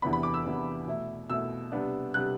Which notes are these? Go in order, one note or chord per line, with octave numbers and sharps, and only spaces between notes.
E2 C3 E3 B3 D4 B5
B5
D6
E6
E2 C3 E3 B3 D4
B2 A3 E4
B2 A3 E4 E6
C3 G3 B3 D4
C3 G3 B3 D4 F#6